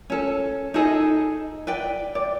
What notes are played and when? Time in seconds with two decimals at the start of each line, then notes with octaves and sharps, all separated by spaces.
0.10 C#4 A4
0.74 D#4 G#4 A4 D#5
1.67 B4 D5 G5
2.15 D5